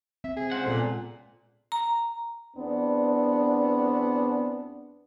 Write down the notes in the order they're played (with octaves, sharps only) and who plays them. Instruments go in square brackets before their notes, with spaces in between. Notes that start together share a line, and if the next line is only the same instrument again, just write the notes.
[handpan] C4 [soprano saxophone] E5
[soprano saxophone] G#4
[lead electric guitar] C#2 F#5 [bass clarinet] C5
[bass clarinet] A#2 [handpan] B3 A4
[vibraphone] A#5
[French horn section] E2 B3 C4 D4